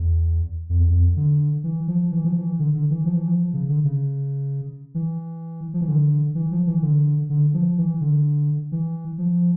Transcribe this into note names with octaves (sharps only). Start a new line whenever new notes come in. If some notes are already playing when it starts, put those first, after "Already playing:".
Already playing: E2
F2
E2
F2
D3
E3
F3
E3
F3
E3
D3
D3
E3
F3
E3
F3
C#3
D3
C#3
E3
F3
E3
D3
E3
F3
E3
D3
D3
F3
E3
D3
E3
F3